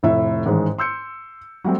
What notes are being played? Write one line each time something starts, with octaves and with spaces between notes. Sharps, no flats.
F1 A2 E5
A1 G#2 D#3 G#3
C6 E6 G6 C#7
F#3 G3 A3 C4